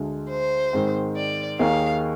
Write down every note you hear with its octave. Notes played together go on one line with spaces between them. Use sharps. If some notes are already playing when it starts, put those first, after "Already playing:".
Already playing: D2 D3 G#3
C5
G#2 D#3 G#3 C4
D5
D#2 D#3 A#3 D#4 G#4 F5